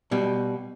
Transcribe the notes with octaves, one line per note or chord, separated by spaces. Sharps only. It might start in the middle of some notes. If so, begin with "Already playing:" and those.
B2 G3